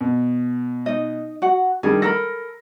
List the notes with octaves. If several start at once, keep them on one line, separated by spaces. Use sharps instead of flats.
B2
D#4 D#5
F#4 F#5
D#3 G3 D4 G#4
A4 A#4 B5 A#6